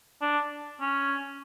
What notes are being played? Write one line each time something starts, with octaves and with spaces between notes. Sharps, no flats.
D4
C#4